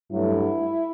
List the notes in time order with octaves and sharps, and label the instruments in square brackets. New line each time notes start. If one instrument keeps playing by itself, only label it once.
[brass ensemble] G2 F#3 A3 E4